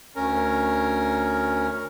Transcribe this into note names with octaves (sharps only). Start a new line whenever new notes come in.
D2 C#4 A#4